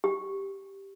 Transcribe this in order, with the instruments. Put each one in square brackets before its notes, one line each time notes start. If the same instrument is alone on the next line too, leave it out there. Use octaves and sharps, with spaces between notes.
[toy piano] G4